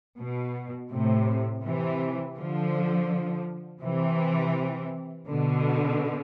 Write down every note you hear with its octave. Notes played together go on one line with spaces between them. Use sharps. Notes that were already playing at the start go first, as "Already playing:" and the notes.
B2
A2 C3
C3 E3
D3 F3
C3 E3
B2 D3